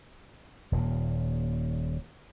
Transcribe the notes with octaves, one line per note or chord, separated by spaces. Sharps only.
D#1 A#2